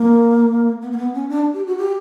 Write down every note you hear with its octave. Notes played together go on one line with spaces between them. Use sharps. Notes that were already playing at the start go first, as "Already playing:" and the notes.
Already playing: A#3
B3
A#3
B3
C#4
D4
G4
F#4
G4